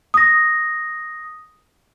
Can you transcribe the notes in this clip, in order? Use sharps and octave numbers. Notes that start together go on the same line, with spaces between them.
D#6 A#6